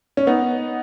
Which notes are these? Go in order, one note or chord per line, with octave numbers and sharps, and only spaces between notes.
C#4
B3 D#4